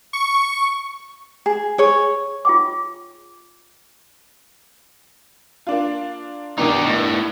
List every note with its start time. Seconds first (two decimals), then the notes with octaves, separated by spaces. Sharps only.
0.13 C#6
1.46 G#4
1.78 G#4 C#5
2.45 F4 G5 D6
5.67 A#3 D4 F4
6.58 G2 B2 D#3 D#4 G4
6.86 A2